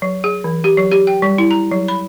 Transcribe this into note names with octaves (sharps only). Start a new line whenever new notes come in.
F#3
G#4
E3
G4
F#3
G4
G5
G3
E4
A#5
F#3
B5